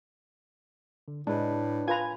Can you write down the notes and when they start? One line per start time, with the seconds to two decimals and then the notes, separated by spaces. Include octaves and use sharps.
1.08 D3
1.27 A2 G#3 D4 B4
1.88 F4 B4 G#5 A#5 G#6